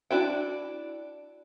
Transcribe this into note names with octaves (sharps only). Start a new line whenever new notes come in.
D4 E4 F#4 G5